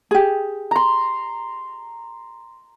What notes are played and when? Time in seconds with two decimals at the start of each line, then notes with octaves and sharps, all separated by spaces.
0.11 G4 G#4
0.71 A#5 C6